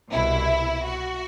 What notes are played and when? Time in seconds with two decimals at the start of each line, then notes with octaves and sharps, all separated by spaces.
0.11 C2 B2 E4
0.85 F#4